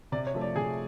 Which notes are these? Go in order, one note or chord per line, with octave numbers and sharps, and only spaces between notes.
C3 D5
C#5
F3 A3
D5
C3 G#4 G#5